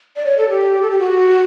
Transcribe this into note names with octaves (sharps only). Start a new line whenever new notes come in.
D5
C#5
A4
G4
A4
G4
F#4